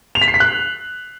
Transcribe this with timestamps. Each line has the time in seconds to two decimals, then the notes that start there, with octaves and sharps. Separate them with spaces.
0.15 F7
0.22 B6
0.28 C7
0.34 B6
0.40 F#6